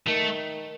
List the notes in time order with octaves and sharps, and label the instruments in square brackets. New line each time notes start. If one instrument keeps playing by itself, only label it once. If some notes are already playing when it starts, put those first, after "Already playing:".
[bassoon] D#3 [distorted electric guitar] A3